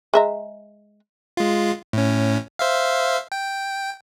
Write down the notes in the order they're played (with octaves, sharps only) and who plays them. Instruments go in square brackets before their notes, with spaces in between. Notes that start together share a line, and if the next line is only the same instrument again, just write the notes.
[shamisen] G#3 E5 A#5
[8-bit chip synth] G#3 F4
A2 C#4
C5 E5 F5
G5